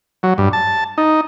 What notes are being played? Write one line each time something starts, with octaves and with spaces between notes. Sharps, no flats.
F#3
G2
A5
D#4